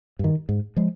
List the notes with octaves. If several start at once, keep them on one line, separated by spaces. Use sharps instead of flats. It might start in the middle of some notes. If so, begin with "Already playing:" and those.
G2 D#3
G#2
F3 G#3